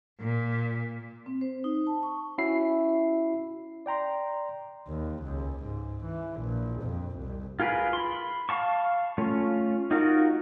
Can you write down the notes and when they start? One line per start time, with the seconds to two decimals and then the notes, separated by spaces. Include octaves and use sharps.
0.20 A#2
1.26 C4
1.41 C5
1.64 D#4
1.87 A5
2.03 C#6
2.38 C#4 E4 F#4 E5 C7
3.86 D5 G5 A#5 C6
4.88 D#2
5.23 C#2
5.64 G#2
6.05 E3
6.41 A#1
6.82 F2
7.18 C2
7.60 F4 G#4 A#4 B4
7.93 B5 C6
8.49 F5 A5 C#6
9.18 A3 C#4 F4
9.91 D#4 F4 F#4 A#4